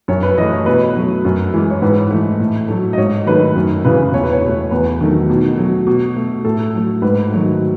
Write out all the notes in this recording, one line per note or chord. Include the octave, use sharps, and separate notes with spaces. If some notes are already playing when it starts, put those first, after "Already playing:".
F#2 C#5
B4
E3 A3 D#5
C#5
B2 B4
F#3 A3
F#2
E3 G#3
C#5
G#2 B4
E3 A3
A2
F#3 A3
D#5
G#2 C#5
D#3 F#3 A3 B4
F#2
C#3 E3 B4
E2 C#5
B4
C#5
B2 A3
E2 B4
D#3 F#3 A3
B2
F#3 A3
B2
A3
A2 A4
F#3 A3
G#2 B4
D#3 F#3 A3